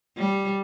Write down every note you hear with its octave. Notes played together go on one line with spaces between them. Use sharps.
G3